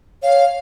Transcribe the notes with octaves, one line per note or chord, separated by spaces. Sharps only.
C#5 F5